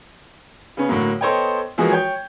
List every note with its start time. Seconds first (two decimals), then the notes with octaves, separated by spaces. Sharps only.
0.77 C#3 B3 C#4
0.89 A2 D3 F#3 A#3
1.21 B3 A4 C5 C#5 D#5 G5
1.78 E3 F3 G#3 A#3 F#4 G#4
1.92 C#5 G5 G6